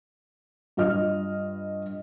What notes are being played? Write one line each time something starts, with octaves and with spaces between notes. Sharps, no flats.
G2 F4 D#5 F6